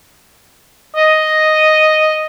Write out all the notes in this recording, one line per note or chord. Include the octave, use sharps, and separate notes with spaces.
D#5